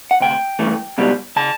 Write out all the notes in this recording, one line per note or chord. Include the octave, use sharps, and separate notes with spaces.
F#5
D2 C3 G5
G2 E3 A3
C#2 B2 G3
C#3 A5